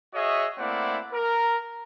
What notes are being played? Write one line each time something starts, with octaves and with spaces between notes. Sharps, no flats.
F#4 G#4 C#5 D#5 E5
A3 A#3 C4 E4 D5 F#5
A#4